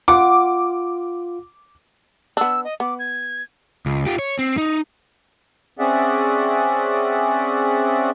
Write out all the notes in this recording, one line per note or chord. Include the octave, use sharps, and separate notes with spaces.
F4 F#5 D6
B3 D4 E6
D#5
B3 D6
G#6
C#2
F4 G4
C#5
C4
D#4
C4 C#4 G#4 D5 E5 F#5